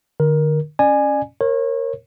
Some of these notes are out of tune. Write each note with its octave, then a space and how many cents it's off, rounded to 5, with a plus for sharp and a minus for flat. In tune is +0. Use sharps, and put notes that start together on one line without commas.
D3 +35 A#4 +15
C#4 +0 D5 +35 G#5 +0
A#4 +0 C#5 -30